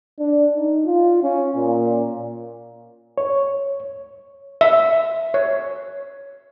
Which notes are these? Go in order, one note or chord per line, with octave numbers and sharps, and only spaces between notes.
D4
D#4
F4
C#4
A#2
C#5
E5
C#5